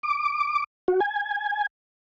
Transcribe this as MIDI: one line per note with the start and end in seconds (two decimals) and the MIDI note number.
0.03 0.64 86
0.88 1.00 66
1.00 1.67 80